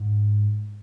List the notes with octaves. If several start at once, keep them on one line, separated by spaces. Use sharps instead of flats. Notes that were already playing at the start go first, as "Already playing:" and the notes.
Already playing: G#2